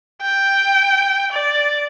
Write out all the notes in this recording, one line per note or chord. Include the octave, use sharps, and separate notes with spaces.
G5
D5